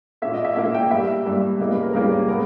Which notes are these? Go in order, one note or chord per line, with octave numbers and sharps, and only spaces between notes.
A#2 A#3 E5
D#5
E5
A#2 A#3 E5
G5
G2 G3 A#3 E5
G2 G3 A#3
E2 C#3 G3 A#3 D#5
B4
A#4
E2 C#3 G3 A#3 A#4
C#3 G#3 B3 A#4